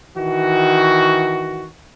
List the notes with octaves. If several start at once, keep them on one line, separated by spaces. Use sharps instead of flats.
D#3 E3 F#4